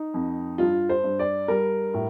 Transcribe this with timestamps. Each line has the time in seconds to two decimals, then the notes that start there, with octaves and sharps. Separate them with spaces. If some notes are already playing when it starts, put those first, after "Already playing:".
Already playing: D#4
0.14 F2
0.58 G2 F4
0.89 C5
1.04 G2
1.19 D5
1.48 G3 A#4
1.94 A2